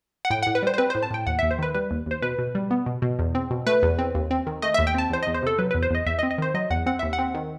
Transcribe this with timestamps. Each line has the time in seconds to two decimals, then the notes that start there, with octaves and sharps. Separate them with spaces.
0.25 F#5
0.30 A2 G5
0.43 A2 F#5
0.55 B4
0.63 G3 C5
0.74 C5
0.78 C4 B4
0.90 A2 C5
1.03 A5
1.11 A2 G5
1.27 D#2 F#5
1.39 D#2 E5
1.51 C5
1.58 D#3 B4
1.75 G3 B4
1.91 D#2
2.06 D#2 C5
2.22 B2 B4
2.39 B2
2.55 G3
2.71 B3
2.86 B2
3.02 B2
3.19 E2
3.35 C4
3.51 B2
3.67 A3 B4
3.83 E2
3.99 C4
4.14 D#2
4.31 C4
4.47 D#3
4.62 A3 D#5
4.74 D#2 E5
4.87 G5
4.95 C4 A5
5.10 E2 C5
5.23 E2 D#5
5.34 C5
5.43 C3 A4
5.59 F#3 B4
5.71 E2 B4
5.83 C5
5.90 E2 D#5
6.06 E2 E5
6.19 D#5
6.23 C4
6.31 D#5
6.38 D#3 C5
6.54 F#3 D#5
6.70 E2 F#5
6.86 C4 F#5
6.99 D#2 E5
7.13 F#5
7.19 C4
7.35 D#3